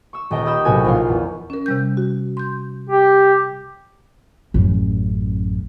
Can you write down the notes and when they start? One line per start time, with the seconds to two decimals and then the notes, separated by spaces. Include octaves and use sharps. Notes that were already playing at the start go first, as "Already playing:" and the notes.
0.13 C#6 E6
0.31 D#1 D#5 G5 A#5
0.45 G4 G5 B5 D#6 E6 G6
0.65 B1 A2 C3 F#4 A#4 G#5
0.84 A#1 F4 C#5 F5
1.09 E2
1.50 C#4 A#4
1.66 C3 G3 G6
1.97 F#4
2.37 C6 G6
2.90 G4
4.54 A1 F#2